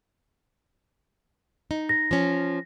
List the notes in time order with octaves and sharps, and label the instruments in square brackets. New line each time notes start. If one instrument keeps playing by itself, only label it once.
[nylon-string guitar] D#4
[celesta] A#6
[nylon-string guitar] F3 C#4